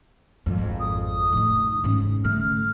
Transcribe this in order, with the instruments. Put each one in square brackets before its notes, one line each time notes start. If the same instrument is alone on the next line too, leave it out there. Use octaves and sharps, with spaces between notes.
[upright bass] G#1 F2
[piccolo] D#6
[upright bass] A2 D#4
G#2 C#4
[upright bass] D3 A3 [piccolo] F6